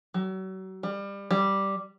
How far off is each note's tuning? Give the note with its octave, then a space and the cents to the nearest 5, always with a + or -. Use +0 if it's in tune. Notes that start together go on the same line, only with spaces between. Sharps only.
F#3 +35
G3 +25
G3 -5